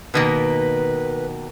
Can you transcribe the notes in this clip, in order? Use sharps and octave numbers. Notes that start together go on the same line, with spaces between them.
B2 D#3 A#3 B4